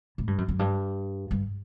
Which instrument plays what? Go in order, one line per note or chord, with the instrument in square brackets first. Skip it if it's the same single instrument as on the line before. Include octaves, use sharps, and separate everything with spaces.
[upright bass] A2
G2
F#2
F#2
G2
G2